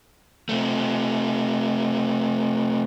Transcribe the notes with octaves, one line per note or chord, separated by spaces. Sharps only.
C3 A3